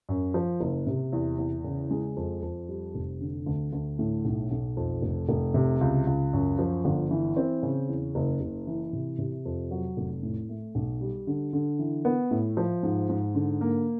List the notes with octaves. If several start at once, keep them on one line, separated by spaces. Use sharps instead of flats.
F#2
F3
F#1
C3
E2
E2
C#3
G#3
F2
F2
G3
F1
D3
D2
D2
A2
B1
B1
F2
F1
F1
C3
C#2
C#2
F#2
F3
G1
E3
C4
C#3
E2
F#1
F#1
E3
C3
C3
F2
F#3
F1
A2
A3
B1
G3
D3
D3
E3
B3
A2
F3
G#2
G#2
D3
A#3